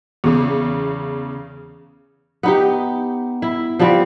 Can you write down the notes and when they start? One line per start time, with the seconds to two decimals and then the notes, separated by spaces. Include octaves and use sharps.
0.24 E2 C#3
2.43 B3 D#4 G4
3.42 E4
3.79 F3 G3 B3 C4